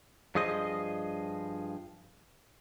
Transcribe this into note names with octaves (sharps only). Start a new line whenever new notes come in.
G2 F3 G#4 C5 D#5